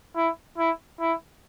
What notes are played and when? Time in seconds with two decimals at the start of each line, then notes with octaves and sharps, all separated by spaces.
0.16 E4
0.58 E4
1.00 E4